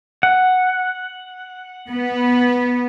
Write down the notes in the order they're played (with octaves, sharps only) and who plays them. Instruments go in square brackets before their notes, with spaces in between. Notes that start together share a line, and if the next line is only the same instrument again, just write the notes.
[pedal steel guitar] F#5
[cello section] B3